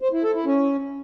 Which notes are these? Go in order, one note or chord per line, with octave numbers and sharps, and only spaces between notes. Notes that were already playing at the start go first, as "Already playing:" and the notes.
C5
E4
A4
E4
C#4